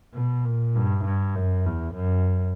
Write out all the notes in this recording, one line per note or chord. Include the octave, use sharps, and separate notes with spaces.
B2
A#2
G2
G2
F#2
E2
F#2